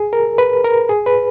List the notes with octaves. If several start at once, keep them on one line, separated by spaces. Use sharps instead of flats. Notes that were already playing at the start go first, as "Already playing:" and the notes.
Already playing: G#4
A#4
B4
A#4
G#4
B4